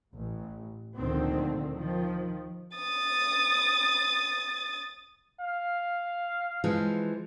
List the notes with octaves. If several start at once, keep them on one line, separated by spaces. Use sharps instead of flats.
A1
D2 A#2 D3 D#3 F3 C4
D#3 F3
D#6 A6
F5
E3 F3 G#3